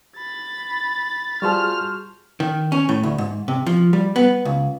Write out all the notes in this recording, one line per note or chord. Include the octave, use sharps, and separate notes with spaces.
B5 A6
G3 F4 F#4 G#4 C5 A5 F6
D#3
C#4
A2
D2
G#2
C3
F3
G3
B3
C#2